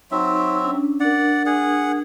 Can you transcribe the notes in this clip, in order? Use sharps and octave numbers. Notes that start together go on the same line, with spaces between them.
F#3 C4 D#4 E5
C#4 D4
D4 A#4 D5 F#5
G#4 F#5